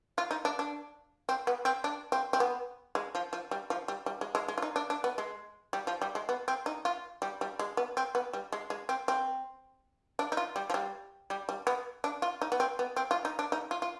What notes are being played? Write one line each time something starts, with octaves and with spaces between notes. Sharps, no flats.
F4
D#4
D4
D4
C4
B3
C4
D4
C4
C4
B3
G#3
F3
F3
G3
F3
G3
G3
G#3
G#3
G#3
F4
D#4
D4
D4
B3
G#3
G3
F3
G3
G#3
B3
C4
D#4
F4
G3
G3
G#3
B3
C4
B3
G3
G#3
G#3
C4
C4
D4
D#4
F4
G3
F3
G3
G3
G3
B3
D4
F4
D#4
B3
C4
B3
C4
F4
D#4
D4
D#4
F4
F4